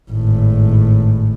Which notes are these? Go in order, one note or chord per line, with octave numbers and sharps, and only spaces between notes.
G#1 A2